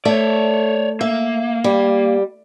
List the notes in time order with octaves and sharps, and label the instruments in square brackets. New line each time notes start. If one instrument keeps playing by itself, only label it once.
[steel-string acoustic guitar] A3 [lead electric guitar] C#5 D5
[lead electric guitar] A#3 [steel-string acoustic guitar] E5
[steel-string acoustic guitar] G3